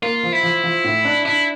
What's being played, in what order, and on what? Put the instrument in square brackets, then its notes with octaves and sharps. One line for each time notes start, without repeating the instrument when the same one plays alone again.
[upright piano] A#3 [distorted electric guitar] F4
[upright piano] F3
[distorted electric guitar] E4
[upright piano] F3
F3
A2
D4
[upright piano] D4 [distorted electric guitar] E4